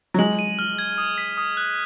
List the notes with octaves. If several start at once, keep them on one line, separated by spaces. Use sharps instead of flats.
F#3
G#3 F#7
D#7
F6
G#6
D#6
B6
D#6
F#6